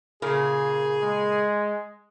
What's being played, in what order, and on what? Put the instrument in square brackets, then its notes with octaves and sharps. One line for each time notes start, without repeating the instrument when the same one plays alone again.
[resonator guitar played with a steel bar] A#2 C#3 A#4 [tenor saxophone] G#4
[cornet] G#3